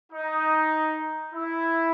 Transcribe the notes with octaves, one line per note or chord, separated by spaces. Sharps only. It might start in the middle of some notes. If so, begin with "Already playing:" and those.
D#4
E4